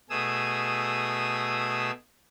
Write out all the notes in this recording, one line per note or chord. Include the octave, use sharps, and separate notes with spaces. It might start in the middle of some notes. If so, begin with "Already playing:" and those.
B2 A3 G#4 D#6 E6